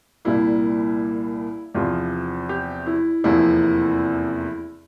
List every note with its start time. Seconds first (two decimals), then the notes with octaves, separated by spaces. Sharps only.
0.25 C2 A#2 G3 A#3 E4
1.75 E2 C3 F3 F4
2.49 G4
2.86 E4
3.24 F1 E2 C3 F3 A#3 E4